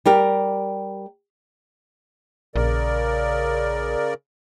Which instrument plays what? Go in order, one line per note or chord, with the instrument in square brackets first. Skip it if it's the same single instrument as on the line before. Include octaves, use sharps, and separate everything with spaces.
[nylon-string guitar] G3 G4 A#4
[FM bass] A#1 [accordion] C#3 A#4 D5